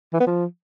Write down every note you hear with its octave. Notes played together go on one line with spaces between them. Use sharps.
E3
B3
F3